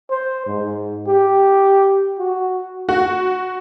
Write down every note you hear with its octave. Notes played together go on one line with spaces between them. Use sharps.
C5
G#2
G4
F#4
F#4